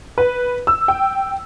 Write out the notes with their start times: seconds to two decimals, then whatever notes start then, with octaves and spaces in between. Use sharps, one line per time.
0.18 B4
0.67 E6
0.88 G5